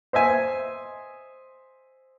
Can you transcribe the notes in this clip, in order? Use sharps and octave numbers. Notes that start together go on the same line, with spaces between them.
C5 D#5 E5 G#5